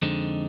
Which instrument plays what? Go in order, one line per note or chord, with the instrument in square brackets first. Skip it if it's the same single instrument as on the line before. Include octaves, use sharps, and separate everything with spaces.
[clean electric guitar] F2 D3 G#3 C4 D#4